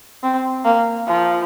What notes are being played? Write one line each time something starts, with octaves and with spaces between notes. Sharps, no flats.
C4
A#3
F3